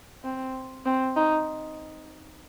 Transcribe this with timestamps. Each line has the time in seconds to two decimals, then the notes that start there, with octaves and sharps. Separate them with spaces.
0.24 C4
0.86 C4
1.17 D#4